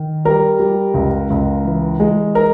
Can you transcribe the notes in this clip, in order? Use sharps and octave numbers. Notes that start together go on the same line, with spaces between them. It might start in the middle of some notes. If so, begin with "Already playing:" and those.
Already playing: D#3
G3 A#4
G3
C#2
C#2
E3
G#3
A#4